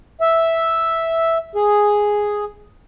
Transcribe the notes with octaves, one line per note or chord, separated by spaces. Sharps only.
E5
G#4